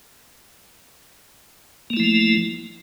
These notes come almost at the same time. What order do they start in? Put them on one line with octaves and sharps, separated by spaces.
A#3 A3 E4 F3